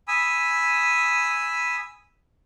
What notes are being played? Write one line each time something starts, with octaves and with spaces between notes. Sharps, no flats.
G#5 B5 D#6 E6